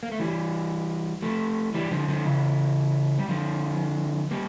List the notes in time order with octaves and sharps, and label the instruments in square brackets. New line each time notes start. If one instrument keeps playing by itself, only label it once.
[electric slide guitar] A#3
A3
E3 G3
F3 A3
E3 G3
D3 F3
D3 F3
C#3 E3
G3
D3 F3
G3 A#3